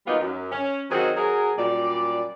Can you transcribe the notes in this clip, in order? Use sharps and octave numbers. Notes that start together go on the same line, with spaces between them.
F#3 G3 A#3 B3 D#4 F4
F#2
C#4
D#3 F#3 C4 D#4 F#4 G#4
F#3 G#4 A#4
F#2 A#2 G3 D5